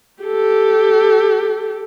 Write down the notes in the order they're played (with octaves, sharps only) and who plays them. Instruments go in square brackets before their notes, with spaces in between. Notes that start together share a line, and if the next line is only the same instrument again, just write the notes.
[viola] G4 A4